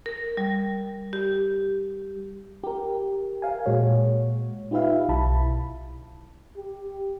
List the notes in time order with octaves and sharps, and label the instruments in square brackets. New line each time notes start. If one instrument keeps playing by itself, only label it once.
[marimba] A#4
G3
G4
[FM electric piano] G4 A#4
A#4 F5 G#5
A#2 G#3 F#4 C#5
D#4 F4 G4 B4 E5 F5
B1 E4 A5 B5
[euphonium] G4